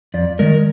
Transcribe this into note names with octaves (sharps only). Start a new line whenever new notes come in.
F2 D5
D#3 G#3 A#4